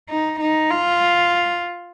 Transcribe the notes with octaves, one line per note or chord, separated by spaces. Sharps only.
D#4
D#4
F4